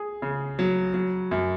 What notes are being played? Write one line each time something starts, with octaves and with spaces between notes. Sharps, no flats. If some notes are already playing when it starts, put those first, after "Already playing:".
Already playing: G#4
C#3
F#3
F#3
F#2